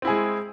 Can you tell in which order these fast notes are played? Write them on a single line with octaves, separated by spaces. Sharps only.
C4 E4 G#4 G#3